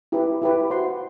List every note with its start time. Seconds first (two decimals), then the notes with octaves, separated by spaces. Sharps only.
0.12 E4 G4 B4
0.42 E4 G4 B4
0.70 F#4 C5 F#5 C6